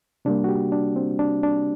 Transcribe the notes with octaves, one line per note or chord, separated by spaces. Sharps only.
C3 G3 A#3 D4
F#4
G4
D4
C4
D4
D4